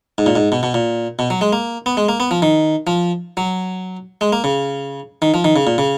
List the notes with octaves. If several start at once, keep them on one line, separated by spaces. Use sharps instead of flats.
G#2
A#2
G#2
B2
B2
A#2
B2
F#3
G#3
A#3
B3
G#3
A#3
B3
F3
D#3
F3
F#3
G#3
A#3
C#3
D#3
F3
D#3
C#3
A#2
C#3